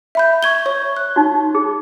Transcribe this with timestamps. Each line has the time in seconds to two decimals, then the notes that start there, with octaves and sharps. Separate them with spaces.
0.15 E5 B5 G6
0.43 C#6 G#6 G7
0.66 C#5 C#6
0.97 F#6
1.16 D#4 F#4
1.55 G#4